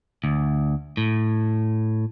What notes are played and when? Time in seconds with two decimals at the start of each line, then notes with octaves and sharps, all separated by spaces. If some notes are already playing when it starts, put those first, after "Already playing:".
0.24 D2
0.97 A2